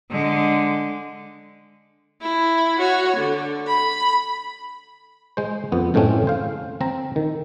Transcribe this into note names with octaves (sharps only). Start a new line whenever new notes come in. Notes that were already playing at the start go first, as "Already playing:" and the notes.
D3 G#3
E4
F#4 C#5
D3
B5
G#3 C5
F2 B3
F#2 A2 G#3 A3 C4 C#4
C5 F5
C4 A#5
D#3